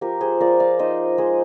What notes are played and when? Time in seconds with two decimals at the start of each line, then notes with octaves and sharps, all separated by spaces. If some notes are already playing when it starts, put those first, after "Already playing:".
0.01 F3 G4 A#4
0.21 G#4 C5
0.40 F3 A#4 D5
0.60 D5 F5
0.79 D#4 C5 D#5
1.18 G#3 G#4 C5